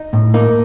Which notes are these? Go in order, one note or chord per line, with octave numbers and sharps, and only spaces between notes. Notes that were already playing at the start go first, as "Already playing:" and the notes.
Already playing: D#4
A2
A#3 D#4